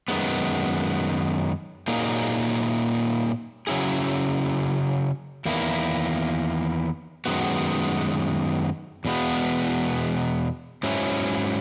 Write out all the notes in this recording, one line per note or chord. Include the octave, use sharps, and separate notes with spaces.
F#2 D#3 G#3 B3
A#2 F#3 A#3 D#4 G#4
C#3 F#3 C#4 E4 G#4
E2 D#3 A#3 E4
F#2 D#3 G#3 B3 F#4
E2 B2 G#3 B3
G#2 F#3 C#4 E4